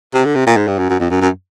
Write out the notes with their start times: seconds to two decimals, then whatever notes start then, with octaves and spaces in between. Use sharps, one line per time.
0.14 C3
0.25 D3
0.35 C3
0.46 A#2
0.57 G#2
0.67 G2
0.79 F#2
0.89 F#2
1.00 F2
1.10 F#2
1.21 F#2